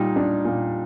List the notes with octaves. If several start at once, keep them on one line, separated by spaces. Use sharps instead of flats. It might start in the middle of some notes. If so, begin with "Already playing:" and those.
Already playing: A#2 G3 D#4
D4
A#2